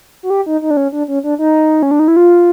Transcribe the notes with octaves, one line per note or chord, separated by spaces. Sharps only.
F#4
G4
D#4
D#4
D4
C#4
D4
C#4
D4
D#4
C#4
D4
D#4
E4
F4